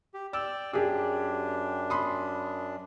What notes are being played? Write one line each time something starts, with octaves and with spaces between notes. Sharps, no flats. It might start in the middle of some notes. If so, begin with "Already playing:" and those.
G4
D5 G5 E6
F#2 D4 G4 G#4
B5 C6 D#6